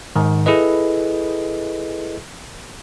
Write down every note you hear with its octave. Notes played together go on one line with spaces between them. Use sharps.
G#2 D#3
E4 G#4 A4 B4 D#5